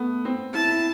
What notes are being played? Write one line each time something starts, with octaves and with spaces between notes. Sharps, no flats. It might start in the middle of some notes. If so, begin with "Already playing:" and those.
Already playing: A3 B3
C4
E4 A5
E4